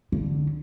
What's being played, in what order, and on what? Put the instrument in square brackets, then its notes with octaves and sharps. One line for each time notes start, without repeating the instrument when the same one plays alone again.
[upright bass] D3